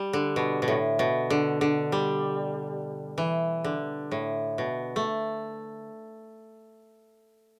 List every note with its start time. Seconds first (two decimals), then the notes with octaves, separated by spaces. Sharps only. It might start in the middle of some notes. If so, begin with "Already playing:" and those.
Already playing: G3
0.13 D3
0.36 B2
0.62 B2
0.68 A2
0.99 B2
1.30 D3
1.61 D3
1.92 G3
3.18 E3
3.64 D3
4.11 A2
4.58 B2
4.96 A3